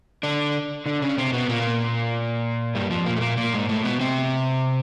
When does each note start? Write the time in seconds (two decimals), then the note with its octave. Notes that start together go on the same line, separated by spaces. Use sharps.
0.23 D3 D4
0.86 D3 D4
1.02 C#3 C#4
1.18 C3 C4
1.32 B2 B3
1.48 A#2 A#3
2.75 G2 G3
2.90 F2 F3
3.06 A#2 A#3
3.16 A3
3.21 A#2 A#3
3.37 A#2 A#3
3.53 G#2 G#3
3.69 A2 A3
3.84 B2 B3
4.00 C3 C4